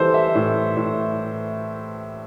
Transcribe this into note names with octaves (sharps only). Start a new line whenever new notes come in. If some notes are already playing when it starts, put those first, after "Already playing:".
Already playing: E3 G3 A4 C5
E5
A2
A2